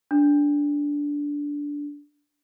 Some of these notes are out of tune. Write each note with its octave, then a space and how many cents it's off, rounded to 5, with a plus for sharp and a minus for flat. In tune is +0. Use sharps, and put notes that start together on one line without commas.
D4 -15